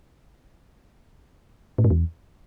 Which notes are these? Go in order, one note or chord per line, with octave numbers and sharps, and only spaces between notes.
A2
G#2
E2